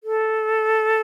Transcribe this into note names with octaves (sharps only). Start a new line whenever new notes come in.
A4